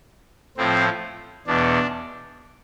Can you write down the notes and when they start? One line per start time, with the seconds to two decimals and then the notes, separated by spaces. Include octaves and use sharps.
0.57 A2 F3 C4
1.46 E2 B2 D4